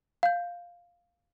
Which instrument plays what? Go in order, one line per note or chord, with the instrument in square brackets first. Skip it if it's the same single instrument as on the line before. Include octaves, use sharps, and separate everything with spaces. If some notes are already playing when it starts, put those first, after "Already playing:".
[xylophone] F5 G6